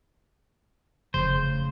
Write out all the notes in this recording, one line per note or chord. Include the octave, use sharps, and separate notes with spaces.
F1 C#3 C5